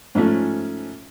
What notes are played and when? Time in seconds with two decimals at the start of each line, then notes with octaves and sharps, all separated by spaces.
0.15 G#2 F3 A3 C#4